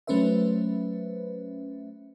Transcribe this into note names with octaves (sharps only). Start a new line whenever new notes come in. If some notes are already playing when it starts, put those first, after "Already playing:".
F#3 A3 C#4 B4 C5 E5